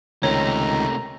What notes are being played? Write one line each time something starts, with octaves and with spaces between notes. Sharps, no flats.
C#2 C3 D#3 A3 C#5 A#5